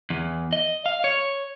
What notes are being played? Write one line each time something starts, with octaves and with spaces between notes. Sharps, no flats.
E2
D#5
F5
C#5